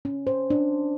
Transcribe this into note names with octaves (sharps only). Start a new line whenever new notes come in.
C#4
C5
D4